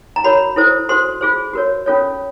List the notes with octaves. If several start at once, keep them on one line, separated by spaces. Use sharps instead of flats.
A#5
F#4 A#4 C#5 B5
E4 A4 C5
F#4 A4 C5 C6
F4 G#4 C5
F#4 A#4 C#5
C#4 F4 A4 C#5